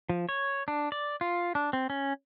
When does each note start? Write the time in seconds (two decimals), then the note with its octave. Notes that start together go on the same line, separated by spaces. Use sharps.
0.10 F3
0.29 C#5
0.68 D4
0.92 D5
1.21 F4
1.55 D4
1.73 C4
1.90 C#4